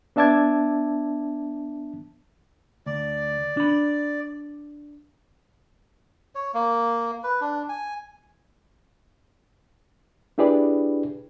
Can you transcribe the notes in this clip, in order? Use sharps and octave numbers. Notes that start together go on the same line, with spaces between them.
B3 D4 E5 A5 D6 G#6
D2 D5
D4 B5
C#5
A#3
B4
D4
G#5
D4 E4 G4 G#4 B4 D5